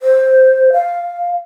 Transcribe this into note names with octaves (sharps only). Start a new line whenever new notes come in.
C5
F5